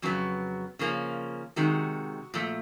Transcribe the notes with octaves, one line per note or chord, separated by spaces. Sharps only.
F2 C#3 F#3 B3
C#3 F3 A#3 C#4
C3 D#3 G#3 F#4
A#2 F3 A3